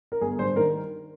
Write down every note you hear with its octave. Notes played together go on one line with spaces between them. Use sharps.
A#4
G1 G#4
G2 C5
D#3 A#4